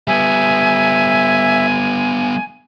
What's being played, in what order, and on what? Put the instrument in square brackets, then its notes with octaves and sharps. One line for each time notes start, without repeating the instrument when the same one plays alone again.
[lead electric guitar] G3 B3 [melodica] E5 [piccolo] G#5